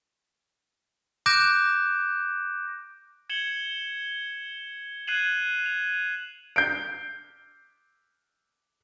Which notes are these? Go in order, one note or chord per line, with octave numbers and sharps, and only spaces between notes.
D6 F#6 G6 A#6 D7 E7
G#6 C#7 E7 F#7 G7
F#6 G#6 C7 D#7 E7 F#7
F7
G6 C7 D7